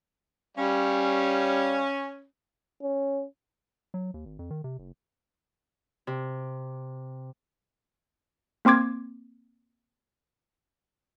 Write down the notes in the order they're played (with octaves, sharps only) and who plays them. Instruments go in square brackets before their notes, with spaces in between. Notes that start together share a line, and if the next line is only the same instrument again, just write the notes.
[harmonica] G3 F5 [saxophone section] C#4
[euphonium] C#4
[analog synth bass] F#3
D#2
G#1
F2
D#3
C3
F#1
[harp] C3
[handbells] A#3 C4 C6 D6 G#6